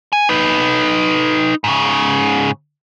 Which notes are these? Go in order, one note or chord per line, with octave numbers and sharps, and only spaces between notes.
G#5
D#4 B4
G#2 C#3